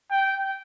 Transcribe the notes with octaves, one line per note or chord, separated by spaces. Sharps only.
G5